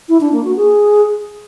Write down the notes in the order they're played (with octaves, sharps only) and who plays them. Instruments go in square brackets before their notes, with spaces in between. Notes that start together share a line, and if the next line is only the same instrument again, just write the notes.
[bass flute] E4
D4
A#3
F#4
G#4